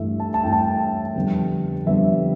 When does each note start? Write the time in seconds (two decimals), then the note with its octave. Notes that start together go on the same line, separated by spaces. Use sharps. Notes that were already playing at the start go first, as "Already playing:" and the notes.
Already playing: G2 E3 A3 E5
0.20 A5
0.34 A5
0.44 G2 E3 A3 G5
0.53 A5
0.61 G5
1.15 F2 D3 G3 B3
1.86 F2 D3 G3 B3 E5